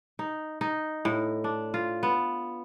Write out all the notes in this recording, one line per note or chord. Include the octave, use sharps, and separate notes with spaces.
D#4
D#4
A2
D4
F4
B3